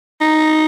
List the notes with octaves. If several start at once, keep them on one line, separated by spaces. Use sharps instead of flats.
D#4